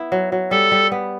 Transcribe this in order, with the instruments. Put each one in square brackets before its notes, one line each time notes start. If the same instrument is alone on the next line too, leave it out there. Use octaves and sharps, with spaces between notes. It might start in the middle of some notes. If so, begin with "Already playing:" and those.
Already playing: [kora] B3 E4
F#3
F#3
[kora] G3 [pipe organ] A4
[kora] G3
B3